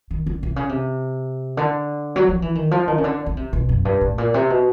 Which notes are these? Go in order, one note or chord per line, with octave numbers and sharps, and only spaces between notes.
D#3
D3
C3
C#3
C3
D3
F#3
F3
E3
D#3
F3
D#3
C#3
D3
C#3
C3
B2
F#2
G2
A2
A#2
C3
B2